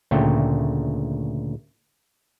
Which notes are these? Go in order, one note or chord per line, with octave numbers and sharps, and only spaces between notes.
D2 A#2 C#3 A3 C#5 G5